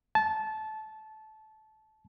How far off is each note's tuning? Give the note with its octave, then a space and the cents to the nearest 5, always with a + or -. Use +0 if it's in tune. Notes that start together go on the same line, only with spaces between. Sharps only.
A5 -20